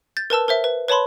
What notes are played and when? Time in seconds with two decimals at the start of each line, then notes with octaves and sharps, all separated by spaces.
0.17 G6 A6
0.30 A#4 B4 A5 E6
0.48 A#4 C5 E5
0.64 B4
0.88 B4 C#5 A5 B5 C6